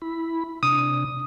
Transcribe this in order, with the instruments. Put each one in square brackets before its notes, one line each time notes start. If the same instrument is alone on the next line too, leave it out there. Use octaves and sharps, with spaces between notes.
[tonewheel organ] E4 B5
[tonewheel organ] C3 D4 [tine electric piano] D#6